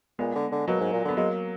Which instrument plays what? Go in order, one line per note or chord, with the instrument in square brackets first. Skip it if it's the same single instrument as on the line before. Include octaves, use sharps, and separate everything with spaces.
[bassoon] A#2 [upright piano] G#3 B3
[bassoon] D3
D3
[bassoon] B2 [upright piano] F#3 A#3
[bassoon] G#2
A#2
D3
[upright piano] B3
[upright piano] F#3 A#3 [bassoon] G#3